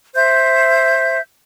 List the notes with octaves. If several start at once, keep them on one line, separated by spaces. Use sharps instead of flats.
C5 E5 G6